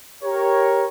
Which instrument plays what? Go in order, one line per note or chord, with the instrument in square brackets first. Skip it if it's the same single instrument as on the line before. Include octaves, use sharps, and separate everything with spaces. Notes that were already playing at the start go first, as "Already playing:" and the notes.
[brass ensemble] G4 A#4 C#5